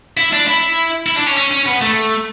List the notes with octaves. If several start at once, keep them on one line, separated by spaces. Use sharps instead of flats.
E4
D4
E4
E4
D4
C#4
C#4
C#4
B3
A3